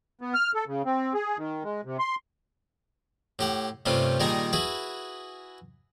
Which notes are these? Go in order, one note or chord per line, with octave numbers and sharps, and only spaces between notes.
B3
F6
A4
C#3
C4
G#4
D#3
G#3
C3
C6
A2 G4 F#5
G2 C3 G3 A3 C#4 F4
A#2 D#3 G3 G#4 G#5 A#5
E4 F#4 G#4 B4